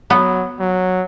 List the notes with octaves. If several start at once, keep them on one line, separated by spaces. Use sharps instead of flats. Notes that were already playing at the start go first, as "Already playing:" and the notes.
F#3 B3
F#3